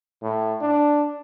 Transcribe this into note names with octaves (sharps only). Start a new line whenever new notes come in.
A2
D4